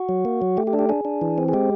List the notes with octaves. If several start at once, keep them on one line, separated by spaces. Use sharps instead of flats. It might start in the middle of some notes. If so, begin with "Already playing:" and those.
Already playing: F#4
F#3
A#3
F#3
A3 G4
G4
D4
G4
D4 G#4
D4
E3
C4
G#4
G#3 G4